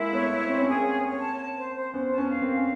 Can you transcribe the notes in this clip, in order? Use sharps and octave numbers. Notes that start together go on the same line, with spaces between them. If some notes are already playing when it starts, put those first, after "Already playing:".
Already playing: G#3 A#3 E4
A3 B3 C#5
E4
C4 C#5
C#4
G#4
A#3 C4
C#5
C#5
A5
A5
C5
C5
B3 C#4 C5
A5
B3 C#4
F5
A#3 C4
F5
C#4